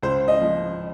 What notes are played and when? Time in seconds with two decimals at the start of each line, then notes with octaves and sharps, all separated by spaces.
0.03 C#2 C5
0.28 D#5
0.41 F3